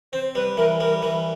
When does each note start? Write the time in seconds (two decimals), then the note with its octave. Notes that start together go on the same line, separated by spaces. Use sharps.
0.13 C4 C5
0.35 G3 B4
0.57 E3 A#4
0.80 G3 A#4
1.02 E3